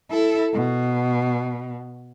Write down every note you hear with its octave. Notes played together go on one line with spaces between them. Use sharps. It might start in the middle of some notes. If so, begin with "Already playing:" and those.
E4 A4
B2